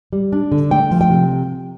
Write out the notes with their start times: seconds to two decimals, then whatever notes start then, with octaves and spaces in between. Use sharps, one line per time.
0.13 G3
0.32 D4
0.52 D3
0.71 A3 G5
0.91 F3
1.01 G5
1.10 C3